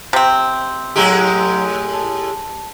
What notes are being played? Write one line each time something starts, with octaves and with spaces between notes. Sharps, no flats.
C3 C4
A2 F#3 G#3 G4 A#5 E6
A5